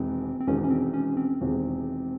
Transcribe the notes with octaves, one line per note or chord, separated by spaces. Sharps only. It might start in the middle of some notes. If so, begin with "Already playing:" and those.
Already playing: E1 E2 C3 D#3 G#3 C4
C4
E1 E2 C3 D#3 G#3 C#4
C#4
C4
C#4
C4
E1 E2 C3 D#3 G#3